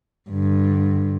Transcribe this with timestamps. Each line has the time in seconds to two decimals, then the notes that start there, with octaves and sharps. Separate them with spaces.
0.30 G2 D3